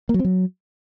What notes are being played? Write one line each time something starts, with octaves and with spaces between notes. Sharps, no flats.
A#3
F#3
C4
F#3